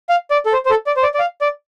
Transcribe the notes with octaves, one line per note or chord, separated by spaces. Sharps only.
F5
D5
A4
C5
C5
A4
D5
C5
D5
D5
F5
D5